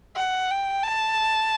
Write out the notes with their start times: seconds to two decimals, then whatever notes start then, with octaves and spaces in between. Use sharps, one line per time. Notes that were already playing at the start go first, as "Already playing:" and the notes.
0.16 F#5
0.50 G5
0.83 A5